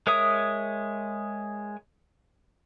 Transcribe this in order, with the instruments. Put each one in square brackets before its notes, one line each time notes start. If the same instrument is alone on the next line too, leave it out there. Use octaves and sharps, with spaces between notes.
[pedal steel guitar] G#3 A#4 C#5 E5 D#6